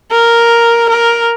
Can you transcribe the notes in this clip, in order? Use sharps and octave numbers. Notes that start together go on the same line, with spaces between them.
A#4
A#4